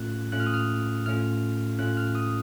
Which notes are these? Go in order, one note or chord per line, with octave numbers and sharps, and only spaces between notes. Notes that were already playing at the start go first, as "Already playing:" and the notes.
Already playing: A2 A3 C#4 F4 F#6
A2 A3 C#4 F4 F#6
F6
D#6
F6
A2 A3 C#4 F4 F6
A2 A3 C#4 F4 F#6
F6
D#6